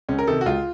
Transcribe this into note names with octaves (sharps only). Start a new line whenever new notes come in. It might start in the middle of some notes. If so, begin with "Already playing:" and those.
C#2 C#4
A#4
C3 D#3 A4
F#4
C#2 F4